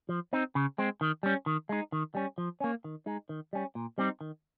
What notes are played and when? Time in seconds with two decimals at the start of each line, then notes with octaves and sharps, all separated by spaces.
0.09 F3
0.33 C4 D#4
0.55 C#3
0.78 G#3 C4
1.01 D#3
1.23 G3 C#4
1.46 D#3
1.69 G#3 D#4
1.92 D#3
2.15 G3 C#4
2.38 F3
2.60 A#3 C#4
2.84 D#3
3.06 G#3 D#4
3.29 D#3
3.53 G3 C#4
3.75 A#2
3.98 G3 C4 D#4
4.21 D#3